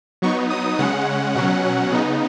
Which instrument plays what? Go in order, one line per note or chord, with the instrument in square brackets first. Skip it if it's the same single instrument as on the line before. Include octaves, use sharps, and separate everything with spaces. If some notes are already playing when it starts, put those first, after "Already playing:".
[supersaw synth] F#3 B3 D#4 C#6
D#6
C#3 G#3 C#4 F#5
B2 F#3 C#4 F#5
C#3 B3 D#4